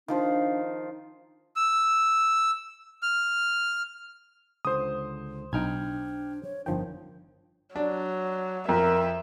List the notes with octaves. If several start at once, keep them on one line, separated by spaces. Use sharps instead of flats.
D#3 F3 D4 C5
E6
F6
C#2 D3 C5 D#6
B1 D4 D#4 G5 A#5 F6 G#6
C#5
G1 D#3 F3 D4 G5
F#3 D4
F2 A#4 E5